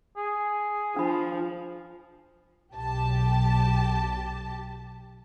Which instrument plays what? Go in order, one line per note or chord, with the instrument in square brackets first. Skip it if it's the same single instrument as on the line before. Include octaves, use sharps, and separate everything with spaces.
[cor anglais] G#4
[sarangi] F3 [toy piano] D4 B5
[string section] B1 G4 A5